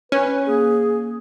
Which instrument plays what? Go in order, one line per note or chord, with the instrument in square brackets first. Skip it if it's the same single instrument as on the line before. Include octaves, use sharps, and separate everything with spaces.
[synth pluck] C#4 [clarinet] B4
[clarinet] A#3 [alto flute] G#4